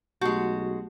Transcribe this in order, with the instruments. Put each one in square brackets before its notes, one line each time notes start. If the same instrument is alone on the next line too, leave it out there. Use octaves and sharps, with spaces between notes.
[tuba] B1 [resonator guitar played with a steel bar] G#3 F#4 [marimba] A3 G4 C#6